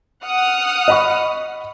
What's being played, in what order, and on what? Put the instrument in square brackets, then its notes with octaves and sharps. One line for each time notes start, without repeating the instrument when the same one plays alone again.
[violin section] F#5 D#6 F6
[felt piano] D#5 B5 C#6